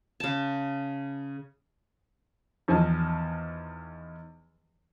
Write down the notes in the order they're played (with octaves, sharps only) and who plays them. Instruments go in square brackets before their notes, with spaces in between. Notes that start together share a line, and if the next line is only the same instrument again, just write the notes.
[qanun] C#3 A5
[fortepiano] E2 D#3 F3 D#5 G#5 A5